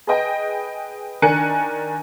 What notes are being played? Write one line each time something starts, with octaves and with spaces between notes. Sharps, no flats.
G#4 B4 D#5 G5
D#3 D4 A#4 G#5 F#6 C#7